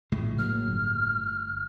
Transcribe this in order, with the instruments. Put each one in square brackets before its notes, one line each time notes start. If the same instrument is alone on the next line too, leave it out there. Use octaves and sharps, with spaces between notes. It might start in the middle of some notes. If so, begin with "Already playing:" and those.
[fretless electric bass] A#1 [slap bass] A2 C#3 G#3
[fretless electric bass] F#3 A#3 [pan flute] F6
[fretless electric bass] G1